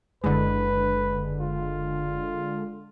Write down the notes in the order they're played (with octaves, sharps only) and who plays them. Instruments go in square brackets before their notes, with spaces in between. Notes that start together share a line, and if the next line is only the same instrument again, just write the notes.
[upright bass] F#1 E4 [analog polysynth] D3 G#3 [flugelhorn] B4
[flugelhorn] F4